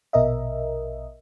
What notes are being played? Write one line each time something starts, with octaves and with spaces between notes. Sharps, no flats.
A#1 B2 A#4 D#5 E5